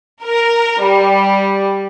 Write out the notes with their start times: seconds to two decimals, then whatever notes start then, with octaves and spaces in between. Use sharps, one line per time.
0.23 A#4
0.82 G3